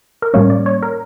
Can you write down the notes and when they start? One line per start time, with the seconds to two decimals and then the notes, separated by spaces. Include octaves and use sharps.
0.22 A#4
0.34 A2 G3 A#3 C#4 C#5
0.50 D5
0.66 C#5
0.83 A#4